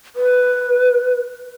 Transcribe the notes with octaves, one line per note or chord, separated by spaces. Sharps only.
B4